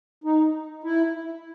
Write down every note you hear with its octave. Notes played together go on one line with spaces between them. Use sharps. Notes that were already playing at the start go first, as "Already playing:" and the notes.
D#4
E4